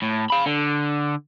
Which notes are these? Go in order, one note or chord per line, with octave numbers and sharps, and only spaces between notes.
A2
F5 B5
D3